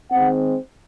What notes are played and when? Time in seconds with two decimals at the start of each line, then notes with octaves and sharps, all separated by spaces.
0.11 D#3 G#3 C4 F#5